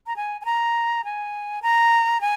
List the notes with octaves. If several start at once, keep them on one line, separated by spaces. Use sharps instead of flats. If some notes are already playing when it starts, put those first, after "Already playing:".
A#5
G#5
G#5
A#5
G#5
A#5
G#5